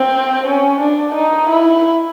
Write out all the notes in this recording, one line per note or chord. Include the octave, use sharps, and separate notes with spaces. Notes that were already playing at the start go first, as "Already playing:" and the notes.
Already playing: C4
C#4
D4
D#4
E4